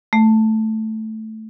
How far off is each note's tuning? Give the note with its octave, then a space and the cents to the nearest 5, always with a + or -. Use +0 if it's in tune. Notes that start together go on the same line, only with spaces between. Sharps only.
A3 -5